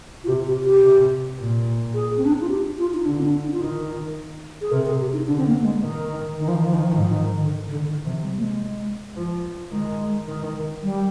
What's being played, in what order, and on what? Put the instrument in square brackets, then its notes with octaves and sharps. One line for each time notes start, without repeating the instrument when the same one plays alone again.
[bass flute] F4
[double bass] C3 [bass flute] G4
[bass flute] G4
G4
[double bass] C3
A#2
[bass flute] G#4
C4
D4
D#4
F4
G4
F4
D#4
[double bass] D3 [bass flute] D4
[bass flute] C4
D4
D#4
F4
[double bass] D#3 [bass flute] D#4
[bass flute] G#4
[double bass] C3 [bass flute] A#4
[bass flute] G#4
G4
D#4
[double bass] D3 [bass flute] D4
[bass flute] C4
A#3
A#3
G#3
[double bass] D#3
[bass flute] D#3
F3
D#3
F3
D#3
F3
[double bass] G#2 [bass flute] D#3
[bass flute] F3
D#3
D3
D#3
D3
D#3
[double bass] C3 [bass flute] F3
[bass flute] G3
A#3
G#3
[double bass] F3
[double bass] D#3 [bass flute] G#3
[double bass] D#3
[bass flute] G3